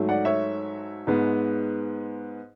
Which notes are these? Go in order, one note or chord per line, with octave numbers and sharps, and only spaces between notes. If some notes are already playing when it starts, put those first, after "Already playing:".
Already playing: G#2 F#3 A3
D5 F#5
C#5 E5
G#2 G#3 B3